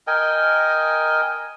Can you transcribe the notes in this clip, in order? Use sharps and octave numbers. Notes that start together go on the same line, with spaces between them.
A#4 D#5 G5 G#5